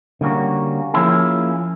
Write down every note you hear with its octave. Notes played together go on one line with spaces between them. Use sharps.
D3 G3 A#3 C#4 F#4
F3 A#3 C#4 E4 G#4